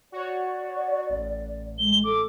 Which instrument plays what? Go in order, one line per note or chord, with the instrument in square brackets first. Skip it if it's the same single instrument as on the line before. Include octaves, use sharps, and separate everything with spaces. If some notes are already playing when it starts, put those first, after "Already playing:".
[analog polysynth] F#4 C#5 [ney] D5
[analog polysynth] A1
[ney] G#3 [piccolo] G7
[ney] A4 [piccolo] D6